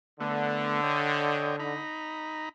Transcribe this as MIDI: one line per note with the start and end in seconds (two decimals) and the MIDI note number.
0.20 1.79 50
0.20 0.81 57
0.20 0.81 59
0.83 1.56 73
0.83 1.56 75
0.83 1.56 79
1.59 2.49 63
1.59 2.49 82
1.59 2.49 83